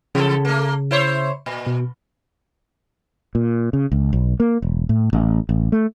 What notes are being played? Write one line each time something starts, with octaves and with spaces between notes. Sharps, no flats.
C#3 E3 A4
A3 A#3
E4 C5 C#5
A#2
B2
A#2
C#3
C#2
B1
A#3
E1
A2
A1
A1
A3